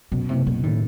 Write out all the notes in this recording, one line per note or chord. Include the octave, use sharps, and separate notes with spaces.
F#2 B2
F#1 C3
F#1 B2
A2 D#3